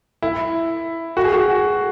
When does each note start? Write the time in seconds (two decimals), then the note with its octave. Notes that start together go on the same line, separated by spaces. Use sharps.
0.22 E4
1.17 F#4
1.24 G#4
1.33 F#4